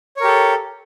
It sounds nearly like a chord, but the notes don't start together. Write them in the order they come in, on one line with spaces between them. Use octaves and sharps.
C#5 A#4 G4 A4